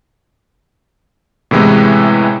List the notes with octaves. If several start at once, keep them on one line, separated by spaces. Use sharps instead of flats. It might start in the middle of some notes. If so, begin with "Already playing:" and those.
A2 C3 E3 G#3 B3